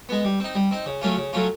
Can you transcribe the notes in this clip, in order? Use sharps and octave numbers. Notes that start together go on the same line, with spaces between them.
G#3 B3
G3
C4 D#4
G3
C4 D#4
C#3
F#3 A3 C#4 F4
C#3
F#3 A3 C#4 F4